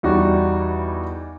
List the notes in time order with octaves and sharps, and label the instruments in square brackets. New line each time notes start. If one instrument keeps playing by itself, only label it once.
[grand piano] E2 G3 D#4 F#4 D5